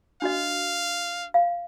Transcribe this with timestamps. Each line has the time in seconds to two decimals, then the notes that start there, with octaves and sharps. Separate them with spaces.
0.22 D4 F#4 D#5 F5
1.34 F5